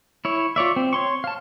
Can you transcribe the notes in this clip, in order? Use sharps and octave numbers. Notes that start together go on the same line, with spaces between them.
E4 C#5
F4 C#5 D5 E5
C4
C#5 C6 C#6
F5 A5